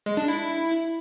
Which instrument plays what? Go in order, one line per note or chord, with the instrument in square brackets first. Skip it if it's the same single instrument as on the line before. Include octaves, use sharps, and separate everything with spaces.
[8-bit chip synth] G#3
D4
E4